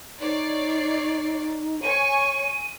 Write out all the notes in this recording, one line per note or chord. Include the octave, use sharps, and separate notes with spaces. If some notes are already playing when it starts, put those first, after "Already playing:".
D#4 C#5 D5 C7
C#5 G#5 C#6 D#7